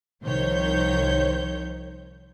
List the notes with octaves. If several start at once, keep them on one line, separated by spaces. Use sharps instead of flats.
C2 D#3 F3 C5 C#5 G6